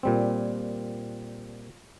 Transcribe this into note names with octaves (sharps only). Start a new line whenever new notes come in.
A#2 G3 C4